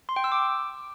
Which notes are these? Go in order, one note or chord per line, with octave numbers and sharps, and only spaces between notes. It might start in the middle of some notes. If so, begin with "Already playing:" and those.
C6
G5
E6
D6